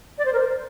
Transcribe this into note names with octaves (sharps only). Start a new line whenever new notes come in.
D5
C5
A#4
C5